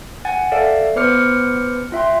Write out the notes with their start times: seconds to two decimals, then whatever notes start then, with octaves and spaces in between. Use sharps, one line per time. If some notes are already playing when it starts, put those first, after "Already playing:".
0.25 F#5 G#5 A6
0.52 A4 D5 E5 F5
0.96 B3 B4 C5 D6 F6 C#7
1.92 F4 E5 G5 C6